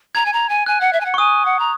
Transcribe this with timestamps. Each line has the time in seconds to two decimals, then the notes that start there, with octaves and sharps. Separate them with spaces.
0.15 A#5 G#6
0.26 G#5
0.33 A#5
0.49 G#5
0.66 G#5 F#6
0.81 F#5
0.93 E5
1.01 G#5
1.06 F#5
1.14 C#6
1.18 G#5 D#6
1.45 F#5
1.59 A#5